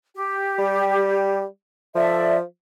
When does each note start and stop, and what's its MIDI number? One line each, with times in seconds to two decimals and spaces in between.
0.15 1.43 67
0.58 1.45 55
1.95 2.42 53
1.95 2.36 69
1.95 2.36 74
1.95 2.36 76